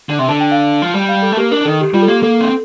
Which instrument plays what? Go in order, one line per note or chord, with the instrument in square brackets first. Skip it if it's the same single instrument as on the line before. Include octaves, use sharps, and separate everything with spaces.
[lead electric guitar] D3
C3
[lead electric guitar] D3 [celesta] A5
[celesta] G5
F5
[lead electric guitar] F3
G3
[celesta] F5
A4
[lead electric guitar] A3
[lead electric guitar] A#3 [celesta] G4
[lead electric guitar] D4 [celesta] A#4
[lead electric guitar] D#3 [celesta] A4
[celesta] G4
[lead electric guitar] G3 [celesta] F4
[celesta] A4
[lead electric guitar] A#3 [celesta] G4
[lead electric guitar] A#3 [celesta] A4
[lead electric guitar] C4